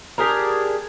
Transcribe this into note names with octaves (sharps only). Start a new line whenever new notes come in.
D4 G4 G#4 A#4